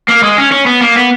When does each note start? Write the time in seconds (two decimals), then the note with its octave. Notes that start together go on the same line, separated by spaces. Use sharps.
0.08 A#3
0.23 G#3
0.37 C#4
0.52 C#4
0.66 B3
0.81 A#3
0.96 B3